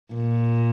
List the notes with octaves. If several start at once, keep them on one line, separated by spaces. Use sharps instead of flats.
A#2